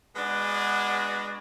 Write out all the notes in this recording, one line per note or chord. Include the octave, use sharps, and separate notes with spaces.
G#3 B3 D4 F#4 G#4